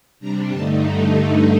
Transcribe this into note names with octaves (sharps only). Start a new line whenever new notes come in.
C3 G3 D4 A#5
G2 D3 A3 D#4 A5